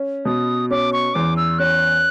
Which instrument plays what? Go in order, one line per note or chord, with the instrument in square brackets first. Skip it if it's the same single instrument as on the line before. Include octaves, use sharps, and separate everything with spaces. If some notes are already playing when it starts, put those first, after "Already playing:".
Already playing: [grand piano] C#4
[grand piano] B2 [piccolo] D#6
[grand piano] C#4 [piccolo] D6
[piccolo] C#6
[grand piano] E2 [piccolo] D6
[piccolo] E6
[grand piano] C#4 [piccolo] F#6